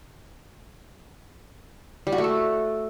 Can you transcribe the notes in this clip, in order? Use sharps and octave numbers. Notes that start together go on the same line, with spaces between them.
G3
F#4
A3
A4